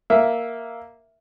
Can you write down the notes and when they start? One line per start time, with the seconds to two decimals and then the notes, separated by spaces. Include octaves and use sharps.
0.10 A#3 E5